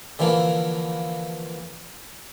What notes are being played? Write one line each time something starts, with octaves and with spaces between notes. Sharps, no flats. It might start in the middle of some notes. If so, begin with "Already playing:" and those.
D3 E3 F3 A#3